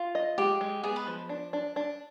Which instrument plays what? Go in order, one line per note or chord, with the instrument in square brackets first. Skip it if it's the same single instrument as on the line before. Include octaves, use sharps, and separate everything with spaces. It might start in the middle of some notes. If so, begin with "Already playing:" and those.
Already playing: [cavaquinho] F4
[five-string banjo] D#5
[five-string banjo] G#3 [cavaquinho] G4
[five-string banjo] G#3
[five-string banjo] B3 [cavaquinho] G#4
[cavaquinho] B4
[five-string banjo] F3
D4
D4
D4